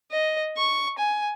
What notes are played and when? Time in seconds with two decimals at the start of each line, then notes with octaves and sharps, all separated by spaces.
0.12 D#5
0.57 C#6
0.98 G#5